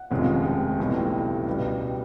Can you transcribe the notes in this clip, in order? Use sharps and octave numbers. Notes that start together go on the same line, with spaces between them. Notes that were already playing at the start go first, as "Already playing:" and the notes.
Already playing: F#5
F1 D#2 C#3 F3 G#3
G5
B1 A2 E3 G3
C#2 B2 G3
G5